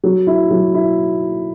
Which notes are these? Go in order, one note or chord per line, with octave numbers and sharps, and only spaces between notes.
F#3
E4
F#3
E4